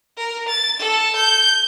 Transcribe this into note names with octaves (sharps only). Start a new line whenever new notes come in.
A#4
A6
A4
G6